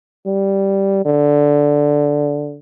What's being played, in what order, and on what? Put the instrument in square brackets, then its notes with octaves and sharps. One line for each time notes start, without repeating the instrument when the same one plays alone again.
[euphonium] G3
D3